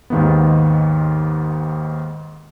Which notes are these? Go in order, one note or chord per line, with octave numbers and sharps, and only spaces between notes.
D#2 G#2 D#3 A#3 B3